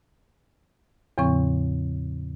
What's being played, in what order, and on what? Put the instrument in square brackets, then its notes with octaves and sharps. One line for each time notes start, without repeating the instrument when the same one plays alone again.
[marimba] E2 A2 C#3 F3 C4 C#6